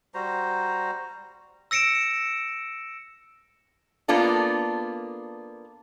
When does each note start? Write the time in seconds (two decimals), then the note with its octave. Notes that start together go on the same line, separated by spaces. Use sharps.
0.14 G3 F#4 C5 A#5
1.71 E6 A#6 C#7 D7 E7
4.08 A#3 B3 D4 F4 A4